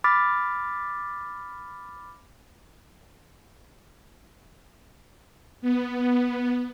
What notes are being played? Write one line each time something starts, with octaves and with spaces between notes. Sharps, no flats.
B5 D6 F6 A6 B6
B3